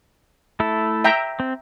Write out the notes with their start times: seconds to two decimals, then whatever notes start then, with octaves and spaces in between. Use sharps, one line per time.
0.60 A3 E4 A4
1.04 E5 G5 A#5
1.40 C4